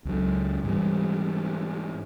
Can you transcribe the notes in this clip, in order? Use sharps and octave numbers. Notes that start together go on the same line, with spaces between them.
C#2 F#3
G#2 E3 G3